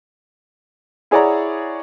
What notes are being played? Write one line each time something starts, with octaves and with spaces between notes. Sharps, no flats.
E4 G#4 C#5 D5 F#5 A#5